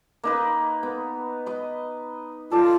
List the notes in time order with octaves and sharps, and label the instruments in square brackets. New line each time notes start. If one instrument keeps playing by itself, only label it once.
[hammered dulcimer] A#3 D#4 B4
B3
B4 D#5
[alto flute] F4 [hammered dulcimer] A4 D5 A5